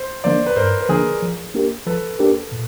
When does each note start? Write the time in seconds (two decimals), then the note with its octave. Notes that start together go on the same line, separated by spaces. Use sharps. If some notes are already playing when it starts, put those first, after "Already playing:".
Already playing: C5
0.24 D3 F3 A#3 D4 C5 D5
0.46 B4
0.56 G2 A#4 C5
0.81 B4
0.89 D3 F3 A#3 D4 G#4 A#4
1.22 F3
1.54 A#3 D4 G4 A#4
1.86 F3 A4 B4
2.19 A#3 D4 G4 A#4
2.52 A#2